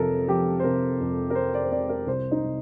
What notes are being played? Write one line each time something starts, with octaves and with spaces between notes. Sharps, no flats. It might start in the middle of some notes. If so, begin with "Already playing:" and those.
Already playing: F2 C3 F3 A4 A#4
F3 G4
C5
C3 A#4
F2
A#4
F2 C5
D5
C5
C3 D5
A#4
C2 C5
D#4
C3